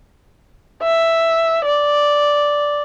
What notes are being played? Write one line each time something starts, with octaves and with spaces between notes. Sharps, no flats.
E5
D5